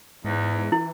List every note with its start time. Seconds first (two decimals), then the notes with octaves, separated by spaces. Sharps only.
0.25 E2 G#2
0.72 E3 E4